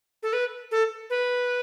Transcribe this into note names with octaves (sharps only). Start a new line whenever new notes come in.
A4
B4
A4
B4